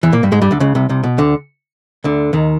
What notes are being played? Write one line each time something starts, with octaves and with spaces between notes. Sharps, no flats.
E2 E3
A#2 A#3
G2 G3
G#2 G#3
G2 G3
D2 D3
C#2 C#3
C2 C3
C2 C3
B2
D2 D3
D2 D3
D#2 D#3